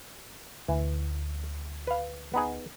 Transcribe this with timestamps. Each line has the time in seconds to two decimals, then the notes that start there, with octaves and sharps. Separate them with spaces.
0.68 D2 E3
1.87 B4 F5
2.34 B3 D#4 G#4